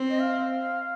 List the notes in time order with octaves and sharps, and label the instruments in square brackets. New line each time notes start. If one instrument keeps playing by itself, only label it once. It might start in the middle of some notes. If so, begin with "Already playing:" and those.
Already playing: [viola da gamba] C4
[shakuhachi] D#5
F5